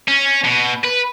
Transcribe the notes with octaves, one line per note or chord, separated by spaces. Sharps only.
C#4
B2
B4